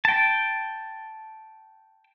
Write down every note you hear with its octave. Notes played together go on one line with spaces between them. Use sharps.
G5 A5